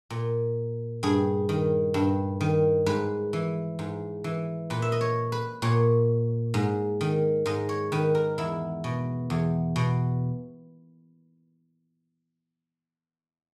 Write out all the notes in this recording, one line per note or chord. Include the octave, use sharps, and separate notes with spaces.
A#2
G2 G#4
D#3
G2
D#3
G#2 B4
E3
G#2
E3
A#2 B4
E5
D#5
C#5
B4
A#2 C#5
G#2
D#3
G#2 D#5
C#5
D#3 B4
A#4
E2 E4
B2
E2
B2